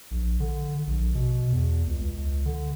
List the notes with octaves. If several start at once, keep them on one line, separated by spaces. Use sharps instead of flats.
A#1
D3
A#1
B2
E2
C#2
C#2
D3